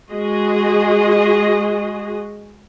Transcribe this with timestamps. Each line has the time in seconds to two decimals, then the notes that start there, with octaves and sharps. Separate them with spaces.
0.11 G#3 F#4 G#4 D#5